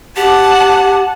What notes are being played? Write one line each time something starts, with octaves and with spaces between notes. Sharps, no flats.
G4 F#5 A5